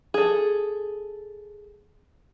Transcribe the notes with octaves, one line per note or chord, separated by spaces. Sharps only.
G#4 A4